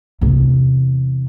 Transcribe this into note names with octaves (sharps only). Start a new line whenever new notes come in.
E2 C3